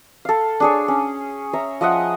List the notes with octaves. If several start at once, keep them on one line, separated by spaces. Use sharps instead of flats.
A4 F5
D4 G#4 C#5
C#4
C#5 E5 A#5
F3 D#5 E5 F#5